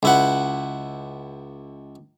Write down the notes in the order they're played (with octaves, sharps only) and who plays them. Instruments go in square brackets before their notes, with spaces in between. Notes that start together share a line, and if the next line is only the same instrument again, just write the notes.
[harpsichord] C#2 E4 F#5